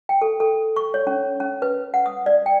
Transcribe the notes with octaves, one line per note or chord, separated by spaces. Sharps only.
G5
A4
A4
C#6
C#5
C#4
C#4
B4
F#5
D#6
D5
G5